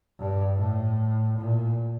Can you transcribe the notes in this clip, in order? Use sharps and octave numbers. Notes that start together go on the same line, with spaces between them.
G2
A2
A#2